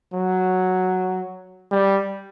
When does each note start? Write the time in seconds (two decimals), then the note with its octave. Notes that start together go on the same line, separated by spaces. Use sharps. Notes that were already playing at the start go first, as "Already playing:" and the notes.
0.14 F#3
1.72 G3